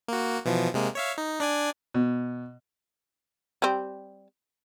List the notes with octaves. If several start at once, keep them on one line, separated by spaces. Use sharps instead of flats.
A#3 F#4
B2 E3 F3
C3 G#3 A#3
C#5 E5 F5
D#4
D4 D5 G#5
B2
G3 C4